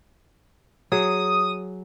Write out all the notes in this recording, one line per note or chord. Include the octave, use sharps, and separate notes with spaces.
F#3 G#4 D#6